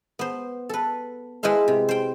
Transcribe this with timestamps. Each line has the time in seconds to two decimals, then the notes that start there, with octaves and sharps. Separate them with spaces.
0.19 B3 C5
0.69 A4 B4
1.43 G#3 E4 B4 C5 F5
1.68 C3
1.89 C5 G5